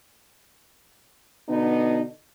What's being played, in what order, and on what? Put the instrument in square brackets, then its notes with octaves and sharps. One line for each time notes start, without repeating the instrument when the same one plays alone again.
[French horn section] B2 D3 B3 D4 D#4